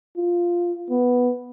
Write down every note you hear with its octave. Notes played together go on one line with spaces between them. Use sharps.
F4
B3